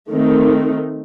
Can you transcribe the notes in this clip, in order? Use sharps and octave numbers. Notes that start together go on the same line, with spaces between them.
D#3 A3 C4 D#4